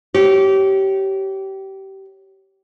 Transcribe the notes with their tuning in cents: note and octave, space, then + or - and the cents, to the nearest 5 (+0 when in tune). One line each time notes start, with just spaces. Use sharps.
G4 -25 C#5 +0